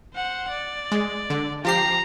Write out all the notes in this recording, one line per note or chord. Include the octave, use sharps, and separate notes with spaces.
C5 F#5
D5
G#3
D3
F3 G4 A#5 C7